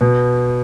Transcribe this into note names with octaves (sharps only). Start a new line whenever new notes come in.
B2